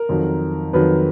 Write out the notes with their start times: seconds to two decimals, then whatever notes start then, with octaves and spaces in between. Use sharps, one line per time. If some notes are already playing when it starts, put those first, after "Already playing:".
Already playing: A#4
0.09 F2 D#3 F#3
0.73 F2 D#3 F#3 B4